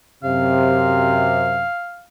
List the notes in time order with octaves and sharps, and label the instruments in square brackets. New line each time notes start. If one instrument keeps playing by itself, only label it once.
[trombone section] F#2 C3 [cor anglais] F5